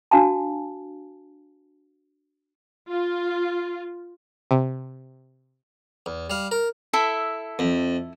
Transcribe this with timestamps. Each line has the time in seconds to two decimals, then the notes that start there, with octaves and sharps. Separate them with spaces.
0.11 D4 F#4 F5 G#5 A5
2.88 F4
4.51 C3
6.06 E2
6.30 G3 F5
6.51 A#4
6.93 E4 A4 E5
7.59 F2